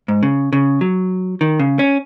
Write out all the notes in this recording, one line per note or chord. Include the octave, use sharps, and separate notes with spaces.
G#2
C#3
C#3
F#3
D#3
C#3
C#4